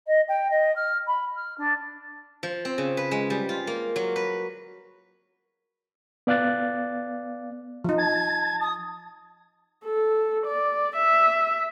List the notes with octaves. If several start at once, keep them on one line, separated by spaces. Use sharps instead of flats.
D#5
G5
D#5
F6
B5
F6
D4
F3
C4
C#3
B4
G#3
G3
F4
A#3
F#3
B4
B3 D5 F5 D6 F#6 A6
F3 D#4
A5 G#6
D#6
A4
D5
E5